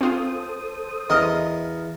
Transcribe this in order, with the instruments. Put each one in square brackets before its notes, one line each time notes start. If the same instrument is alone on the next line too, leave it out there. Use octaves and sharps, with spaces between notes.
[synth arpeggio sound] C4 F4 G#5 [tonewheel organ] A4 C5 D#6
[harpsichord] E2 A#4 F5 [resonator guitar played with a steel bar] D#5